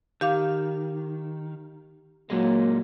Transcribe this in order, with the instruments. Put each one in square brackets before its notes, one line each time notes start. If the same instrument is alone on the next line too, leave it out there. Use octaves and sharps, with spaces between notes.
[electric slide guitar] D#3 [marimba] G4 F5 D6
[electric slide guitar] A#2 G#3 [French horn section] F#3 A#3